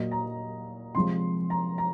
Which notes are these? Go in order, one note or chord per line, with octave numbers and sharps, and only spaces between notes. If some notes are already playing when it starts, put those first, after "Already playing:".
Already playing: A#2 F#3 A#3 D#5
A#5
C3 F3 G#3 C6
A#5
A#5